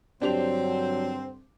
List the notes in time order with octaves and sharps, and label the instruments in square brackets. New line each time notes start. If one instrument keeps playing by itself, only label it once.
[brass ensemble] G2 D3 C5 [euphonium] F#3 [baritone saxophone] C4 [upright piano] D4 G4 F7